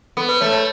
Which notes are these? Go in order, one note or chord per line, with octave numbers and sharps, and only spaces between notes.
B3 A4
B4
A3 C#5
C#5